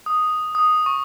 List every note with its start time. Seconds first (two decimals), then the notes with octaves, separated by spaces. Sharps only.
0.06 D#6
0.55 D#6
0.86 C#6